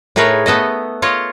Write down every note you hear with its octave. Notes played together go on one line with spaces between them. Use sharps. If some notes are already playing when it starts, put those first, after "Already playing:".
A2 D#4 G#4 A#4 B4 C#5
A3 B3 A4 D#5
F4 C#5 D#5